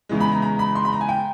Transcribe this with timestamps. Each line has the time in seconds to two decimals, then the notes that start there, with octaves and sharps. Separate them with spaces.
0.09 E2 C#3 E3 G#3
0.20 B5
0.32 A#5
0.42 A#5
0.59 B5
0.75 C6
0.85 B5
0.93 A#5
1.01 G#5
1.09 G5